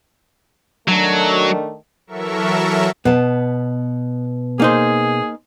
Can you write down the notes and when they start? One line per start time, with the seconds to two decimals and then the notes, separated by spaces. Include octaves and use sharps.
0.88 D#3 F#3 A3 D4
2.07 E3 F#3 A4 A#4 E5 C#6
3.05 B2 B3 A5
4.60 A#3 D#4 G#4 C5